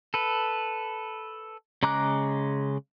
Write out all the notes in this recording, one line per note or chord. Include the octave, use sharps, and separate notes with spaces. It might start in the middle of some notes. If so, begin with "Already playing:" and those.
A4 B4
C#3 G#3 A#5 D6 F#6